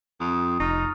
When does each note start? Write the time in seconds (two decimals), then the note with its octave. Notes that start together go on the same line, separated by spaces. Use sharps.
0.20 F2 D#6 F7
0.60 F1 D#4 C#6 F6 A6